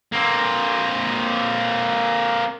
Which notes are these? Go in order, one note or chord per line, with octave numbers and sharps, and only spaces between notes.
A#3 C4